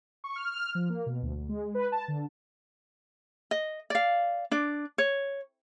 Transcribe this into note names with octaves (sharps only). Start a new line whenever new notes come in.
C#6
F6
F6
F3
A#3
B2
D2
D2
G#3
B4
A5
D3
D#5
D5 F5
D4 D5
C#5